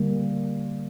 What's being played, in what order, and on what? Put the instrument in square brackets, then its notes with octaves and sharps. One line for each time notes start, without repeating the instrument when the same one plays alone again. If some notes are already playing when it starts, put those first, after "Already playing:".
Already playing: [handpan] D3 G3 A#3